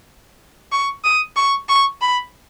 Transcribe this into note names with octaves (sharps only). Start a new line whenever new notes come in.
C#6
D#6
C#6
C#6
B5